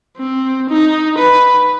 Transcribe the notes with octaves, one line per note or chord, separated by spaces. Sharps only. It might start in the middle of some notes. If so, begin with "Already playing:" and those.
C4
D#4
B4